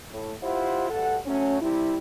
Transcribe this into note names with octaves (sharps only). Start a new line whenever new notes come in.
A2
E4 F4 G4 C5 F#5
D2 G2 A4 F#5
F#3 A3 C#4
C3 G3 E4